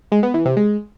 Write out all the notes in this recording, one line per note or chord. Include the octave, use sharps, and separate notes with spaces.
G#3
B3
E3
C3
G#3